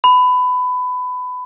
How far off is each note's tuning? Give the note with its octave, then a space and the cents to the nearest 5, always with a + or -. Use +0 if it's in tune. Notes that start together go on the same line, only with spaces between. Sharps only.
B5 +20